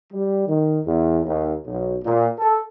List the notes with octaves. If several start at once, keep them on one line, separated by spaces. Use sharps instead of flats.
G3
D#3
E2
D#2
B1
A#2
A4